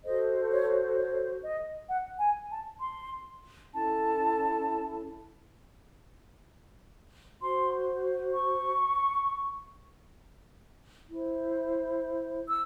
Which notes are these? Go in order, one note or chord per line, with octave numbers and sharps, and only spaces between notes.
F#4 A4 C5 D#5
C#5
C#5
D#5
F#5
G#5
A5
C6
C#4 E4 A4 A5
F#4 C5 C6
C#6
E4 C5
E6